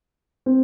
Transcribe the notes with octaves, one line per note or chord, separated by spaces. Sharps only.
C4